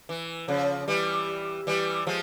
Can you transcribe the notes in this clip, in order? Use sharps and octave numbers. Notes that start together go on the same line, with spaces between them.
E3
C#3 F3
E3 G3
E3 G3
F3 G#3